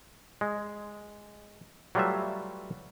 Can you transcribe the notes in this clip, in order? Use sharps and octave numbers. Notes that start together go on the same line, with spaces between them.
G#3
F#3 G3 A3 F4 B4 E5